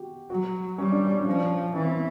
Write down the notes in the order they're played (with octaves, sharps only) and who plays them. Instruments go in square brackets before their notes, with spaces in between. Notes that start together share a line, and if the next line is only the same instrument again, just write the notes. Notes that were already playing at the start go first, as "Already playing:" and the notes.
Already playing: [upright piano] F#4 G4
[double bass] F#3 [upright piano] F#4
[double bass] G3 [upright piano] C#4
[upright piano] D4
C#4
D4
[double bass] F3
[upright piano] C#4
[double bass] E3 [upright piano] C#4
[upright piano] C4
B3